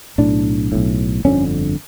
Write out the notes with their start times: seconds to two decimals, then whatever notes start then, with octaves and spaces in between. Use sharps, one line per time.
0.18 B1 A2 D4
0.72 B1 A2
1.25 G1 F2 D3 C#4